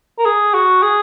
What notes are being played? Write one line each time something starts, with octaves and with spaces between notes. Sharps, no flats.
A#4
G#4
F#4
G#4